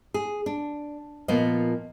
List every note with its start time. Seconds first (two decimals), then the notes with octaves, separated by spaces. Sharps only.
0.14 G#4
0.46 D4
1.28 A#2 F3 A#3 B3 D#5